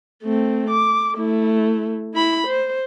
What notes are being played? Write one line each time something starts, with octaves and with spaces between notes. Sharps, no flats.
A3 C4
D6
A3 E4
E4 B5
C5